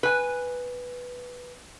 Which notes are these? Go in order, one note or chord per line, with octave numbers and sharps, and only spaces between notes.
B4 G#5